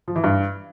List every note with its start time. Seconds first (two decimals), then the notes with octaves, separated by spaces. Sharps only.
0.08 F3
0.16 E3
0.24 G2